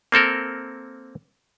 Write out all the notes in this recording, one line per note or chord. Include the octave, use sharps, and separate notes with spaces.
A#3 C4 A4 A#4